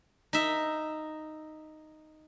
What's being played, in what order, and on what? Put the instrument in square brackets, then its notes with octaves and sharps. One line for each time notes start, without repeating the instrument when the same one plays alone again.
[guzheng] D#4 E5